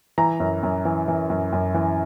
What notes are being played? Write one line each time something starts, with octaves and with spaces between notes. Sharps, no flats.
E3 A#5
F#2
F#2
E3
E3
F#2
F#2
E3